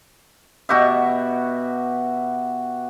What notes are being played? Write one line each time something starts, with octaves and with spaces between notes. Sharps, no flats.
B2 F#4 G4 E5